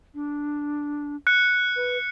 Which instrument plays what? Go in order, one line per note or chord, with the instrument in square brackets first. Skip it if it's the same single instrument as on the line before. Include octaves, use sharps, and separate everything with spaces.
[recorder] D4
[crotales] F#6 C#7
[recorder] B4